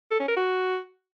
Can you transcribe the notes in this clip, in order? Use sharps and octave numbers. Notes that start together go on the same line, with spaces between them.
A4
C#4
A#4
F#4